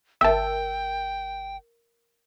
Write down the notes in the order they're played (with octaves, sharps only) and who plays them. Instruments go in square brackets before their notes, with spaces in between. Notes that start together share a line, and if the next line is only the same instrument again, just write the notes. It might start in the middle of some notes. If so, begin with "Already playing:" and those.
[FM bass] G1 [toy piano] A#4 E6 [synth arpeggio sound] E5 A5 [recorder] G5